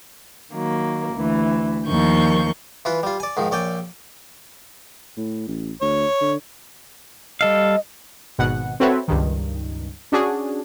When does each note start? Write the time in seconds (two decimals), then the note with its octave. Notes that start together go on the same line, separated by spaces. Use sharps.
0.52 D#3 F#3 A#3
1.16 D2 E3
1.87 D#2 F3 A#4 C#6 G6
2.85 E3 F4 B4
3.03 G3 F4
3.20 D5 G#5
3.37 G#2 D#3 F3
3.51 A#1 C#5 D5 G5 G#5
5.17 A2
5.47 A1
5.81 D2 C#5
6.21 D3
7.41 G3 A4 D#5 F5
8.38 G#1 B2 F#5
8.80 C4 F#4 A4 B4 C#5 E5
9.08 C#2 G2 D#3
10.12 C#4 D4 F#4 G#4